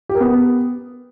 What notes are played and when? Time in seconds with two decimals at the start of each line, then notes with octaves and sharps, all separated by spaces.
0.09 G4
0.15 A#4
0.20 B3